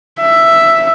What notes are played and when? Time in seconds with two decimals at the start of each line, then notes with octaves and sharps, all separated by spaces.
0.20 E5